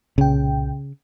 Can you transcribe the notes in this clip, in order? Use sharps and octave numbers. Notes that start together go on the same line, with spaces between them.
C2 A#2 C#3 G5